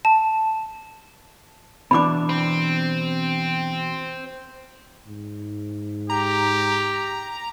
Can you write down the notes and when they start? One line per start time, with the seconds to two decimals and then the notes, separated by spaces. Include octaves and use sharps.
0.05 A5
1.91 B2 E3 D4 B5 D6
2.29 C4
5.07 G#2
6.10 G4 A#5